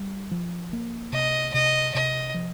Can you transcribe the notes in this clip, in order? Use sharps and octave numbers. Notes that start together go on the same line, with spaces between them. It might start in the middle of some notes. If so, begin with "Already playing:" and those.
Already playing: G3
F3
A#3
C3 D#5
C3 D#5
C3 D#5
F3